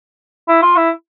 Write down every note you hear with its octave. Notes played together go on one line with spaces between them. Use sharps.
E4
F4
E4